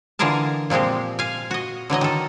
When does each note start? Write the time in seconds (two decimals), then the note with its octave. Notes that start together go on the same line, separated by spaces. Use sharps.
0.19 D3 E3 F4 G#4 A#4 A5
0.70 A#2 F3 G#3 C4 G4
1.19 F5 G#5
1.51 F#4 D#5
1.90 D3 E3 F#3 D#5
2.01 D#3 A4